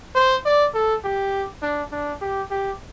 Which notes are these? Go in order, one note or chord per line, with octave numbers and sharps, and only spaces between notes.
C5
D5
A4
G4
D4
D4
G4
G4